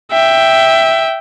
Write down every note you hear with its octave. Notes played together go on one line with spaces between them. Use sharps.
E5 G5